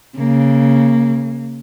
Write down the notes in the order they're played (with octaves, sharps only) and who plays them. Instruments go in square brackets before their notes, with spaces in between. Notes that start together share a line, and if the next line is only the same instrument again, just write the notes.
[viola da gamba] C#3 [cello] A#3